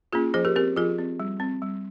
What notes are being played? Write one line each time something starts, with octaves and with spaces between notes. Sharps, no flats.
A#3 C#4 F4 G#4
F3 G#4 C5
G4 A#4
C4 G4 A#4
F3 F4 G#4
C4
G3
C4
G3